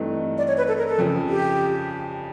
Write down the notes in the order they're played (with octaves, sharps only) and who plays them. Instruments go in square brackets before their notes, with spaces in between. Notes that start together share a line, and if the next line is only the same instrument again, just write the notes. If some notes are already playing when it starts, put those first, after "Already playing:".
Already playing: [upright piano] G2 E3 A3 C4 D#4
[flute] D5
C#5
B4
A4
A#4
A4
[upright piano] F2 C#3 F3
[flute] G4